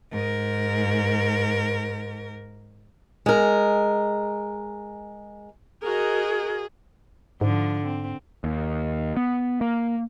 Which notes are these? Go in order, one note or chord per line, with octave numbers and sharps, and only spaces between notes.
G#2 A#4
G#3 A#4
F#4 G#4 A#4 D#5
G#2 D3 F3
C4
D#2
B3
A#3